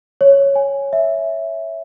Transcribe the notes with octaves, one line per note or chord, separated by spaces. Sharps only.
C#5
G#5
E5